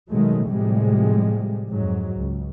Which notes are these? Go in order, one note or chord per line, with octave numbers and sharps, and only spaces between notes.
B2 D#3 F#3 G#3 A3
A2 C3 F3 G3 G#3
F2 G#2 F#3
C#2